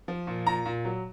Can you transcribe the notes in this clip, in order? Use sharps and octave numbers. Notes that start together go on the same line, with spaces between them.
F3
A#2
A#2 A#5
A#2
F#3